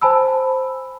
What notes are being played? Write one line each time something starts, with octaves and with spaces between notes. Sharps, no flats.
C5 G#5 A5 B5 E6